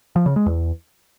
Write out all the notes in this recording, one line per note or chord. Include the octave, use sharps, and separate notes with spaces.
F3
C#3
G#3
E2